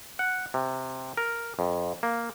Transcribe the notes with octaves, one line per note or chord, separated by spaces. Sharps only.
F#5
C3
A#4
F2
A#3